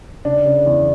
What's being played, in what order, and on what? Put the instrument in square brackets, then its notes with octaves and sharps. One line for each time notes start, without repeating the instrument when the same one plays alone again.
[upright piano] C#3 D4
C#3
E2